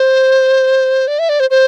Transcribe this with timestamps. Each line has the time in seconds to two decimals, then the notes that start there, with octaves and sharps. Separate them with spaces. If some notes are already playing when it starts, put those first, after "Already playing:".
Already playing: C5
1.07 D5
1.19 E5
1.29 D5
1.40 C5
1.50 C5